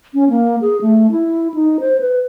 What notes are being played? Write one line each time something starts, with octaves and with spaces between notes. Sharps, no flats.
C#4
A#3
G#4
A3
E4
D#4
C5
B4